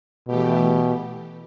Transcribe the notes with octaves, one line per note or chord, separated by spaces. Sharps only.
B2 E3 A3 G4